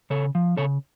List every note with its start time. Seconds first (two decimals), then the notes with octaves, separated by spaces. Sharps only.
0.10 C#3 A4 C#5
0.35 F3
0.57 C#3 A4 C#5